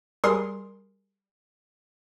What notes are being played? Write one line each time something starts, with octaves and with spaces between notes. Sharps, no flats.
G3 G#4 A#4 C6